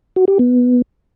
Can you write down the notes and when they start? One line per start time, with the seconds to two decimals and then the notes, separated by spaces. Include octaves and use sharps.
0.16 F#4
0.28 G4
0.39 B3